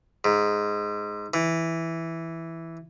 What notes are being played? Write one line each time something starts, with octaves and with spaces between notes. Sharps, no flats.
G#2
E3